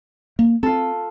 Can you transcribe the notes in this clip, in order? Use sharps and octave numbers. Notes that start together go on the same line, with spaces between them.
A#3
C4 F4 A4